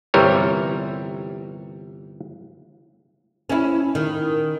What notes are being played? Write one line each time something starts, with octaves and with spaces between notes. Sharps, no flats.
G1 C3 E3 G3 A#4 C#5
C#4 E4
D#3